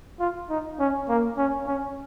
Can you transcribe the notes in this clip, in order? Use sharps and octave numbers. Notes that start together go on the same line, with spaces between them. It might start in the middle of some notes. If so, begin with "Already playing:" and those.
F4
D#4
C#4
A#3
C#4
C#4